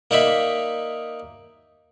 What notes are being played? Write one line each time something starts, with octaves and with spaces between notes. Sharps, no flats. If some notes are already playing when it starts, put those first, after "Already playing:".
A#3 D#4 D5 E5 B5